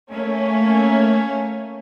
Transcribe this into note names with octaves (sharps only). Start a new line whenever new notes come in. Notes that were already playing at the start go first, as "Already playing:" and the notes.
A3 A#3 C#4